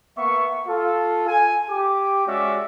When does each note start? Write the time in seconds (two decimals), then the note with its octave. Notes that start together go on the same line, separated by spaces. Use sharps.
0.17 A#3 B3 E5 C#6
0.67 F4 A4
1.27 G#5
1.70 G4 D6
2.27 G#3 C#4 F#4 D5 E5 D6